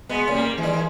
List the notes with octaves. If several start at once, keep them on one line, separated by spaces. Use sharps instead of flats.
B2 G#3 B3
A#2 C#3
G3 A#3
E3 G#3
D#3 G3
E3